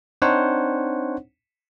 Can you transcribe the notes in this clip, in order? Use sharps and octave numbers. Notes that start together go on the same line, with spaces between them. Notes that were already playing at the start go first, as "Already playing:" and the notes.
C4 D4 D#4 C5 C#5 F#5